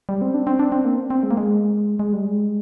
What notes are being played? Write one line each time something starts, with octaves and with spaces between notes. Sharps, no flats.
G3
C4
D4
C4
D4
C4
A#3
C4
C4
G#3
A#3
G#3
G#3
G3
G#3